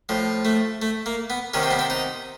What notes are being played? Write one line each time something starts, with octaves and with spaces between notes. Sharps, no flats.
A2 F3
A3
A3
A#3
B3
C3 D#3 C#4
C4
B3
C4
D#4